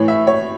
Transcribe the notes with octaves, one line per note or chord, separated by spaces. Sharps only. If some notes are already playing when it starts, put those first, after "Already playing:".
Already playing: A2 E3 C#5
E5
C#5